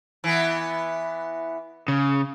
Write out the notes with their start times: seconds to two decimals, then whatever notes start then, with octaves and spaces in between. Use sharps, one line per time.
0.24 E3 B3
1.88 C#3